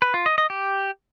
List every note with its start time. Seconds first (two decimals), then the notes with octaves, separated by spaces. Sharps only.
0.02 B4
0.14 F4
0.26 D#5
0.38 D#5
0.50 G4